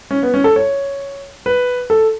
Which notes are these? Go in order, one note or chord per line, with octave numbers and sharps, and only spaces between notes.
C#4
B3
C#4
A4
C#5
B4
A4